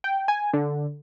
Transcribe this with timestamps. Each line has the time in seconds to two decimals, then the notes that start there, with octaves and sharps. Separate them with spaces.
0.04 G5
0.28 G#5
0.53 D3